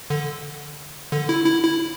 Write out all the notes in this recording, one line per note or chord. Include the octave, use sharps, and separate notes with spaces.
D3
D3
E4
E4
E4